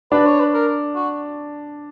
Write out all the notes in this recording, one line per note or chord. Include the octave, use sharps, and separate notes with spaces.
D4 B4
C#5
B4
A#4
F#4